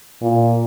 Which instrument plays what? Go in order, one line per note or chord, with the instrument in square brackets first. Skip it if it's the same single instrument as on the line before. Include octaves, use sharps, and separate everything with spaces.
[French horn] A#2